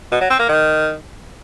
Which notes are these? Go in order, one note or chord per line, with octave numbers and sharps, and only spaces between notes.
B2
F#3
C4
A#3
D#3